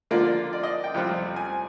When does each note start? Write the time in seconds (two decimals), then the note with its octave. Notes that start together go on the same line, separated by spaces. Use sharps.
0.11 D3 F3 A#3 F4 D5
0.53 D5
0.63 D#5
0.84 G5
0.94 F2 C3 G3 C4 F4
1.36 G#5